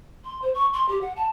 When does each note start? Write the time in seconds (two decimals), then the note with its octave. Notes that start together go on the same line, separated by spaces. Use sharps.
0.25 C6
0.42 C5
0.55 C#6
0.74 C6
0.89 G4
1.01 F#5
1.16 A5